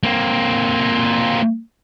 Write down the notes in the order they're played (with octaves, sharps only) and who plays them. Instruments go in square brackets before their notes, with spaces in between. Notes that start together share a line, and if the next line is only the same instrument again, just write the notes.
[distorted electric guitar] A#3 C4